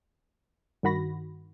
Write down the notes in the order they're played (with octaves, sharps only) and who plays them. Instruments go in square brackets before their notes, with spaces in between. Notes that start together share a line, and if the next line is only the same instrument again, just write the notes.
[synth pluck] G2 D#3 F#4 B5 A#6